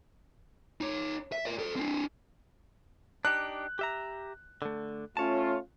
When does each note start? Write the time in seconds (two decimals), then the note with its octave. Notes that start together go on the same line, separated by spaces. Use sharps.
0.81 D#4 C#5
1.32 E5
1.45 A#4 D5
1.59 A4 C5
1.76 C4 D4
3.25 D4 D#4 G4 F#6
3.79 G4 E5 A#5
4.62 D3 A3
5.17 A3 C#4 F4 C#5 A5